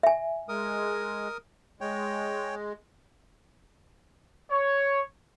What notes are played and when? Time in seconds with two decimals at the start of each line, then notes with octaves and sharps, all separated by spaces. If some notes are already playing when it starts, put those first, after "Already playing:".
0.03 E5 G#5
0.49 G#3 A#4 D#6
1.81 G#3 C#5 G5
4.50 C#5